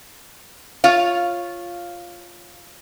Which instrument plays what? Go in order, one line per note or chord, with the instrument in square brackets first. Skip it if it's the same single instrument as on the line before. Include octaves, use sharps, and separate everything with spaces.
[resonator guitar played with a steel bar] F4 C#5 F5